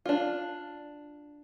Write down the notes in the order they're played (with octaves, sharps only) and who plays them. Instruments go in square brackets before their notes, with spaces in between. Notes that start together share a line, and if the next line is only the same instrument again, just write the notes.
[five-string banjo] D4 F4